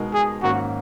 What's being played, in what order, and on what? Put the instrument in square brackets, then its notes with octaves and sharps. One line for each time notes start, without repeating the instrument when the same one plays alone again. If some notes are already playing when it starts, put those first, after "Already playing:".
Already playing: [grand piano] B2 G#3 D#4 A#4
[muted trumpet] G#4
[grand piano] G#2 D#3 A#3 C#4 [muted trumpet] F#4